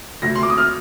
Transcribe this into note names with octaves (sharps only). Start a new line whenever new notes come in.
D2 A#6
C6
D6
D#6
F6